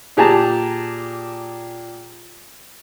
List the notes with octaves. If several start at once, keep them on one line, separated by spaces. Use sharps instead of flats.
A#2 G4 G#4 A5 A#5